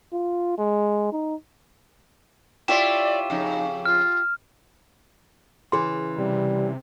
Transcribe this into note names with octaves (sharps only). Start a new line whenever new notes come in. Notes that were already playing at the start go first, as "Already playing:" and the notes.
F4
G#3
D#4
E4 F4 G4 C#5 D5 E5 E7
F2 C#3 D#4
F4 F6
C#3 E3 G#4 C6
C3 G3